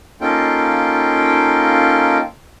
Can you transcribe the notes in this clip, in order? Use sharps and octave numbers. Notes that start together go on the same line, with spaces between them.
A#3 C#4 D#4 F4 A4 G5